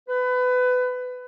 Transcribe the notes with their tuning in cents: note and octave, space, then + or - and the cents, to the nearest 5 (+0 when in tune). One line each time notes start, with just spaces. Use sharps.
B4 +25